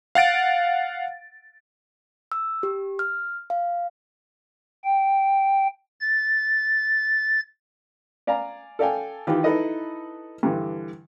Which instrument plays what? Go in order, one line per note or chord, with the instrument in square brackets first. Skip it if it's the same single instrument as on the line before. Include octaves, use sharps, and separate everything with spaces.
[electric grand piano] F5 F#5 A6 D7
[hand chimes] E6
G4
F6
F5
[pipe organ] G5
A6
[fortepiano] D5 F5 G#5 A#5
A4 D5 F5 G5 G#5
D#3 E3 F4 G4 B4
D#4 E4 A4 B4 D#5
G2 D3 E3